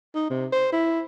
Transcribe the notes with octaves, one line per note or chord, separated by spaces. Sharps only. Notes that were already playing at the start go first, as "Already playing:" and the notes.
D#4
C3
C5
E4